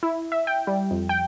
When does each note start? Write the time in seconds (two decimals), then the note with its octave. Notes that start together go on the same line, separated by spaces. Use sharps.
0.03 E4
0.32 E5
0.47 G5
0.67 G3
0.91 F2
1.09 G5